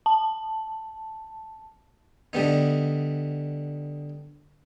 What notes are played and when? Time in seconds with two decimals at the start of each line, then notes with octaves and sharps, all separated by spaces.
0.06 A5
2.33 D3 G3 B3 D#4